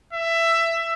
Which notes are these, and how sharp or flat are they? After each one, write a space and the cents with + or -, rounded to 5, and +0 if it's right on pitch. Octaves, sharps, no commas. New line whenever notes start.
E5 +15